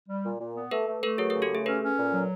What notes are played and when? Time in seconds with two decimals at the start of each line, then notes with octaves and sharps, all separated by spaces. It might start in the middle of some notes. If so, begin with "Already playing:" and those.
0.08 G3
0.24 A#2
0.40 A#2
0.56 B3
0.71 A3 A4 B4
0.87 A3
1.03 A3 A4 B4
1.18 F#3 G#4 A#4
1.30 G#4 A#4
1.35 C#3
1.42 G4 A4
1.50 A3 G#4
1.66 C#4 A4 B4
1.82 C#4
1.98 A#2
2.13 F#3